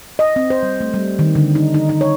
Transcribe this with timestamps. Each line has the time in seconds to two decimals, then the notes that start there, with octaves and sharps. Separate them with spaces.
0.19 D#5
0.36 C4
0.50 C5
0.63 G3
0.80 A3
0.94 G3
1.19 D#3
1.35 D3
1.55 D#4
1.74 D#4
1.89 D#4
2.01 C#5